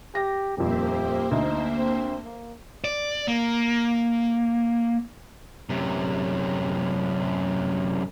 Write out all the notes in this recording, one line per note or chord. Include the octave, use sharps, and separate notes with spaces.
G4 A#6
D#1 F2 A#3 G4 C5 E5
D2 D#4
C4
A#3
D5
A#3
F#2 C3